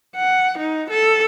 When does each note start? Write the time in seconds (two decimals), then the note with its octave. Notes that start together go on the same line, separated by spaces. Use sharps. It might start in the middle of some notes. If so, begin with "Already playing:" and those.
0.15 F#5
0.58 D#4
0.90 A4